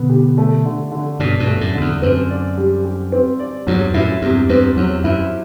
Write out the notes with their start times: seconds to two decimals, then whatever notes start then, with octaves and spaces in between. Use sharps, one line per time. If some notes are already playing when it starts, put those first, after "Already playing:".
Already playing: B2 D3 B3
0.09 G4
0.38 A3
0.65 D3
0.92 D3
1.20 G2 B2 D4
1.40 G2 B2
1.47 A3
1.61 F#2 A2
1.75 F#2 D3
1.81 E2
2.02 F#2 C4
2.30 D5
2.57 G3
2.85 G4
3.12 C4
3.39 D5
3.67 E2 G2 F#3
3.94 F#2 A2 E4
4.22 E2 G2 C3
4.49 E2 G2 C4
4.77 E2 F#3
5.04 F#2 E4